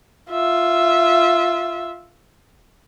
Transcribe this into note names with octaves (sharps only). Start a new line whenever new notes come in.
F4 E5